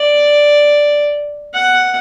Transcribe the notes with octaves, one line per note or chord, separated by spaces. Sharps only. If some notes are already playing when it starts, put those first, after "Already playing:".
Already playing: D5
F#5